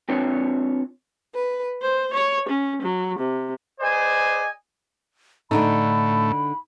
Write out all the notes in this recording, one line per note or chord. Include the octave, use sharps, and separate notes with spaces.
C4 D4 F4 B4 C#5
B4
C5
C#5
C#4
F#3
C3
G#4 B4 C5 D5 D#5 G#5
A2 D3 A3 D4 D#4 B5